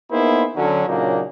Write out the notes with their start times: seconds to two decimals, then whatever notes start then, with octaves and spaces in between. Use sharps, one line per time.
0.11 A#3 B3 D#4 E4 G#4 C5
0.57 D3 F#3 C#4
0.87 A#2 C#3 F#3 A#3 D4 D#4